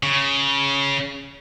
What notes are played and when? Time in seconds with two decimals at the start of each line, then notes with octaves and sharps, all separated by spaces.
0.03 C#3